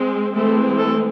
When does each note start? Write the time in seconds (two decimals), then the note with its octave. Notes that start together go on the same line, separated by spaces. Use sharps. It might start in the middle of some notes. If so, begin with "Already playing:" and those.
Already playing: G#3 C4
0.35 E3 G#3 A3 C4 A4
0.78 A3 A4